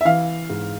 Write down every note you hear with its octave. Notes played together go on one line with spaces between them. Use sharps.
E5
E3 F5
G#2